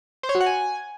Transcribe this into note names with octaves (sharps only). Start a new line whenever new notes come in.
C5
C#5
F#4
F#5
G#5